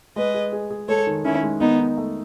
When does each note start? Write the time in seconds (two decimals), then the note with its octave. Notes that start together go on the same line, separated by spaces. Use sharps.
0.16 G#3 B4 D#5
0.34 G#4
0.53 G#4
0.70 G#4
0.88 G#3 A4 C#5
1.07 D#3
1.25 D#3 C#4 E4
1.43 G#3
1.61 D#3 B3 D#4
1.79 D#4
1.97 A3